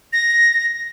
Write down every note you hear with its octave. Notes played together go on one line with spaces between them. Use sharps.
A#6